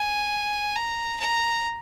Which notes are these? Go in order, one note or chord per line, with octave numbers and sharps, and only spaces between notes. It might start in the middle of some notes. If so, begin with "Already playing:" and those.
Already playing: G#5
A#5
A#5